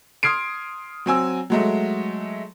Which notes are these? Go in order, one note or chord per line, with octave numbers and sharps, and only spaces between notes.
C6 D#6 F6 G#6 C7 D7
F#3 C4 G#5 E6
F#3 G#3 A3